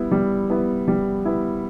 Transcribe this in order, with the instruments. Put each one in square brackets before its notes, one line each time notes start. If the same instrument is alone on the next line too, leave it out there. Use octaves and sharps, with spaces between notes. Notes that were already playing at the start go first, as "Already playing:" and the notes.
Already playing: [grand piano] G3 B3 E4
G3
B3 E4
G3
B3 E4